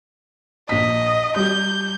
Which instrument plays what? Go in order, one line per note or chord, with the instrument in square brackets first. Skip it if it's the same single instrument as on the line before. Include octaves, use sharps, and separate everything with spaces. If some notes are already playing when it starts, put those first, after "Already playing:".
[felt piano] A#1 B6 [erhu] D#5
[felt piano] G3 G4 [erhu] G6